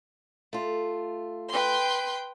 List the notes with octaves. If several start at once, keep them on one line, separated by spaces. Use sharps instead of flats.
A3 F4
B4 G5 C6